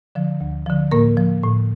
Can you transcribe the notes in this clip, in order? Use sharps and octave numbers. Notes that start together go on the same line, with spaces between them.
D3 F3
D2
D3 F3
A2 A#3 A#4
F3
A2